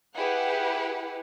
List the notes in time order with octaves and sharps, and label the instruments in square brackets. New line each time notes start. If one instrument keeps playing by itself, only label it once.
[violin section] E4 G4 G#4 B4 F#5